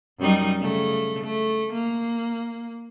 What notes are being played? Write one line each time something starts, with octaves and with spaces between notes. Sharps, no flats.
F#2 G3 D#4
C#3 A3
A3
A#3